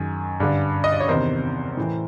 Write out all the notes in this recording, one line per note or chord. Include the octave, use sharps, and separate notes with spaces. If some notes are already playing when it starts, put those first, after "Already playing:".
Already playing: F#2 D#3 G#4
G2 D3
D#5
D5
C#5
E2 C3 D#3 A#4 C5
A2 E3